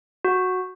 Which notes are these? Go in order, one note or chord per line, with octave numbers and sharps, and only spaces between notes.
F#4